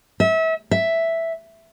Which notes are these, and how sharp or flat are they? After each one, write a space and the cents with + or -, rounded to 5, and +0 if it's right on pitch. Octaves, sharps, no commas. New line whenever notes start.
E5 -30
E5 +0